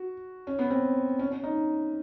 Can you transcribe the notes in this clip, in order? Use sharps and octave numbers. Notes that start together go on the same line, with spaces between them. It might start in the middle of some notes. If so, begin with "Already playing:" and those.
Already playing: F#4
C#4
B3
C4
C#4
C#4
D#4